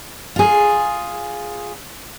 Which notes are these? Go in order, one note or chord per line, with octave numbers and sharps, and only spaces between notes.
F4 G#4